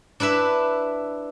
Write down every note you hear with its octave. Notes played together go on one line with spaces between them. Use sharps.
D4 E4 B4 E5